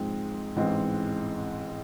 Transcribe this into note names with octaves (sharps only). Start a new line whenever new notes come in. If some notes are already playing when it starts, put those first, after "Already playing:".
Already playing: G#2 F3 G#3 C4
A1 G#2 E3 G#3 C4